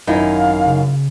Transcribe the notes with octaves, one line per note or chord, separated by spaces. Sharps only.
G#1 F#2 D#4 E4 F5
C#3